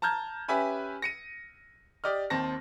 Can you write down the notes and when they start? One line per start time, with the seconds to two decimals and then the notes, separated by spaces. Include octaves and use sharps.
0.02 A5 A#5 F6 G6 G#6
0.48 C#4 G4 B4 E5 G#5 B5
1.02 A#6 C#7 D#7
2.04 G4 D5 D#5 F6
2.30 D#2 C4 A5 A#6